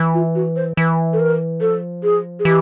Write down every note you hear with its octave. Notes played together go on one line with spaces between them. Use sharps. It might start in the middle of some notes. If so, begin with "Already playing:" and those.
Already playing: E3
F4
F#4
C5
E3 B4
A4
A#4
F3 A4
G#4
G#4
E3 G4